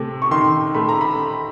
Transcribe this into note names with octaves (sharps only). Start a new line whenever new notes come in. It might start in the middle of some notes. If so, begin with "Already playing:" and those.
Already playing: C3 A3
C#6
D#3 C6
A3 B5
A#5
B5